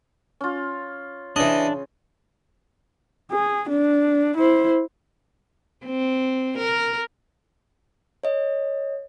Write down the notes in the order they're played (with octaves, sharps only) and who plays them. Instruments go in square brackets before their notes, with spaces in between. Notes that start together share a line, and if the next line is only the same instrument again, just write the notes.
[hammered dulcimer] C#4 F4
[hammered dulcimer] C#3 [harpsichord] E3 D#5 [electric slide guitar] D4
[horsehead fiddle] G#4
D4
E4 C5
[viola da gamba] C4
A#4
[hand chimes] C#5 D#5